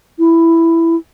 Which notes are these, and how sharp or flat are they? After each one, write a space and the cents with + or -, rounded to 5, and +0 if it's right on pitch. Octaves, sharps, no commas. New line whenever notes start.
E4 +5